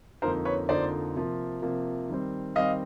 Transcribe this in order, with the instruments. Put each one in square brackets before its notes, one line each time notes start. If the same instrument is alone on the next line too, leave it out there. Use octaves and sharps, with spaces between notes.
[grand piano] F2 D3 F3 A#3 D#4 A#4 C5
B4 C#5
F2 D3 F3 A#3 D#4 C5 D5
C3 F3 A#3
C3 F3 A#3
D#3 G3 C4
D#3 G3 C4 D#5 F5